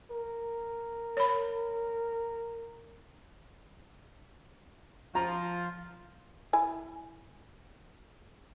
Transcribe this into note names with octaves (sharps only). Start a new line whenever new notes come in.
A#4
C#5 B5
F3 F4 A#5
E4 G#5